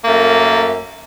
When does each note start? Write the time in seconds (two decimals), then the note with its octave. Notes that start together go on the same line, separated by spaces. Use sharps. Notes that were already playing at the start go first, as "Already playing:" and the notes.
0.05 F#2 A3 A#3